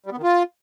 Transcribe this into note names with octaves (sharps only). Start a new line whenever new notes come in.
G3
B3
D#3
F4